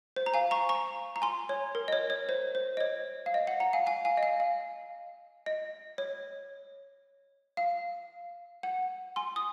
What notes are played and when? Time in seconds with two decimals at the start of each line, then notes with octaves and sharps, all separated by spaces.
0.16 C5
0.26 A#5
0.34 F5 G#5
0.51 A#5 C#6
0.69 A#5 C#6
1.16 A#5
1.22 G#5 C6
1.49 C#5
1.75 A#4
1.88 D#5
1.93 C#5
2.10 C#5
2.29 C5
2.55 C5
2.77 D#5
2.81 C#5
3.26 F5
3.34 D#5
3.47 F#5
3.60 F#5 A#5
3.73 F5 G#5
3.86 F5 G#5
4.05 F5 G#5
4.17 D#5
4.23 F5
4.40 F5
5.46 D#5
5.98 C#5
7.57 F5
8.63 F#5
9.16 G#5 C6
9.36 D#6